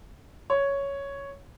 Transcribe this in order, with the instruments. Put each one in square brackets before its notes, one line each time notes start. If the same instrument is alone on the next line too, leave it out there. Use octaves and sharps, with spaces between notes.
[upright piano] C#5